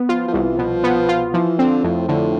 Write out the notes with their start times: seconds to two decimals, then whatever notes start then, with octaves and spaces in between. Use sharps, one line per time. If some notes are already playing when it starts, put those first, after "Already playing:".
Already playing: B3
0.09 F3 F4
0.28 F3
0.33 C2 E3
0.58 B2 F3
0.84 B3
1.09 F4
1.34 E3 F3
1.59 D3 C4
1.84 F2 A2
2.08 A2 D3